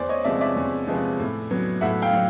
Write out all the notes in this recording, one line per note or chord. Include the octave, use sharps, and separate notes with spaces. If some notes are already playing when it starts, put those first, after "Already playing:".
Already playing: E2 C5 D5
C#5 D#5
C3 F3 G#3 B3 D5 E5
D5 E5
E2
C3 F3 G#3 B3
A2
F#3 B3
A2 E5 F#5
F5 G5
F#3